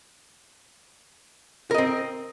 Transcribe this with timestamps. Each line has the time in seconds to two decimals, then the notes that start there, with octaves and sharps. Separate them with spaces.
1.71 A#4
1.74 D#5
1.78 C4